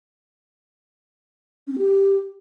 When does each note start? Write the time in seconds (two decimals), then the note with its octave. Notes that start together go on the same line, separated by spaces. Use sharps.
1.67 C#4
1.73 C4
1.78 G4